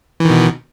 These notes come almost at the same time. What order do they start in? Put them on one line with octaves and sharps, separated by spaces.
E3 D#3 B2